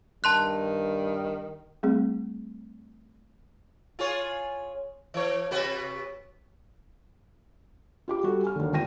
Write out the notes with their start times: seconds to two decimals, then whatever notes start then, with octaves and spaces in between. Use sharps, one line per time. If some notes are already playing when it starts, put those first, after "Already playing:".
0.24 G2 D#3 A5 C6 F#6
1.83 G3 A3 C4 G#4
3.99 F4 G#4 C#5
5.14 E3 C#5
5.51 C3 F#4 B4
8.08 F4 G4 D6
8.23 G3 F#4 G4 A4
8.43 G#5 F6
8.56 D#2 D3
8.73 G#1 F4 G5 A#6 D#7